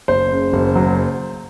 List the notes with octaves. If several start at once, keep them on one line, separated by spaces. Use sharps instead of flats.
F#1 C5
C#3
F#1
F#3